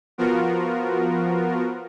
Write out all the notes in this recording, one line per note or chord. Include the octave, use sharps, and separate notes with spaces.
F3 B3 F4 F#4 A#4